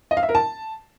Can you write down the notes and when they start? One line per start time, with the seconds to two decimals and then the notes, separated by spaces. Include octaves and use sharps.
0.11 D#5
0.17 F5
0.23 E5
0.29 A#4
0.35 A5